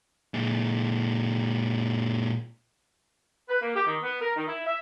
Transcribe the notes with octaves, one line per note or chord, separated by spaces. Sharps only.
A#2 G#3
B4
A#3
G4
D#3
B3
A#4
D#3
E4
E5